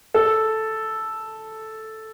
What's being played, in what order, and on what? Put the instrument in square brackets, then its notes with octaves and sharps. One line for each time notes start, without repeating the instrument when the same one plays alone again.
[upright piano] A4